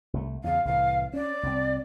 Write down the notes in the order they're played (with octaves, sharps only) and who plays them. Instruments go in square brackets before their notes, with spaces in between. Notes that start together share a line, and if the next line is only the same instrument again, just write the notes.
[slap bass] C2 A3
[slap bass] E2 C#3 [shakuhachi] F5
[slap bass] C2 A2 E3 [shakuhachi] F5
[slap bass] C#4 [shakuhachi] D5
[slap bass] C2 C4